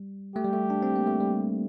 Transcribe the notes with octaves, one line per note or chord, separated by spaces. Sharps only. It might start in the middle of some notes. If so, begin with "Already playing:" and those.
Already playing: G3
A3 G4
G3
A3
D4
C4
A#3
A3
G3